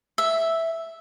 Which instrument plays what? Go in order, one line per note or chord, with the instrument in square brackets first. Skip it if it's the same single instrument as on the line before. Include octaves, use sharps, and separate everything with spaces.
[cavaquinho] E5